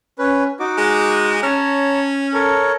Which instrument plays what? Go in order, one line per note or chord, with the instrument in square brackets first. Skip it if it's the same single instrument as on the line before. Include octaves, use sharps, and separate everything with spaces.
[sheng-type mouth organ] C#4 B4
D#4 F#4 D6
[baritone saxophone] G#3
[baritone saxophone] C#4 [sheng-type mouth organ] C#5 A5 A#5
[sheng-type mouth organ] A4 A#4 C#5